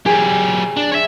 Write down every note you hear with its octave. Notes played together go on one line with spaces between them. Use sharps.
F#3 G4 G#4
D4 E7
C#5 E5